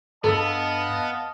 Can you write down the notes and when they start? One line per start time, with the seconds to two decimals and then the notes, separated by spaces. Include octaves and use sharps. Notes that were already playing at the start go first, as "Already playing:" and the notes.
0.24 G2 B3 A4 D#5 F5 A5